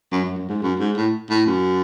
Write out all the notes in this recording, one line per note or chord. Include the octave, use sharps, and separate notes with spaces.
F#2
F#2
F#2
G#2
F#2
G#2
A2
A2
F#2